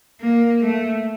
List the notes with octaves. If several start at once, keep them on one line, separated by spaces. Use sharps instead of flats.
A#3
A3